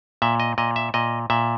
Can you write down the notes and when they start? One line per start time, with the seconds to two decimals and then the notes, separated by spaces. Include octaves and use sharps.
0.22 A#2 E5
0.40 D#5
0.58 A#2 D#5
0.76 E5
0.94 A#2 D#5
1.30 A#2 E5